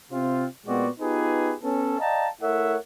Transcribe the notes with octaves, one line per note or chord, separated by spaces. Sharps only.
C3 C4 F4
A#2 G#3 B3 C4 F#4 D5
B3 D#4 F4 G4 G#4 B4
B3 C#4 A4
D5 D#5 F5 G5 A5 A#5
A3 E4 A#4 C#5 E5 F#5